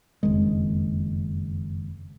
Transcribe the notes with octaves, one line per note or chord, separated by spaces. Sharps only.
F#1 F2 D#3 G#3